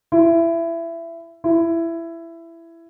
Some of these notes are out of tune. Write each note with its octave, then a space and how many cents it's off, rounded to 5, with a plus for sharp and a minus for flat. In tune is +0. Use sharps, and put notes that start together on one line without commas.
E4 +20
E4 +15